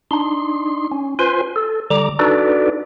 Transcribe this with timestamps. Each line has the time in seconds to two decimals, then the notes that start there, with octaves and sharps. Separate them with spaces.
0.11 D4 D#4 C6
0.91 C#4
1.19 F4 B4 C5 G#5 C6
1.56 A4
1.90 D3 G3 A#5 D6
2.19 D4 D#4 F#4 A4 B4 D5